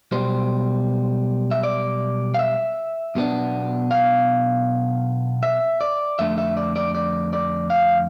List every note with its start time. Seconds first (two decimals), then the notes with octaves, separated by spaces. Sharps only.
0.12 B1 B2 G3 C5
1.51 E5
1.63 D5
2.34 F5
2.39 E5
3.15 B1 B2 B3 D4
3.91 F5
5.43 E5
5.81 D5
6.19 F2 D3 A3 E5
6.38 E5
6.57 D5
6.76 D5
6.95 D5
7.33 D5
7.70 F5